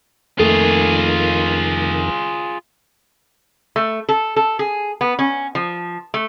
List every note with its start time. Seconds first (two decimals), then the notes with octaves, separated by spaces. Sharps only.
0.39 F2 D#3 A3 A#3 F4 G#4
3.76 A3
4.09 A4
4.36 A4
4.59 G#4
5.01 B3
5.19 C#4
5.55 F3
6.14 A3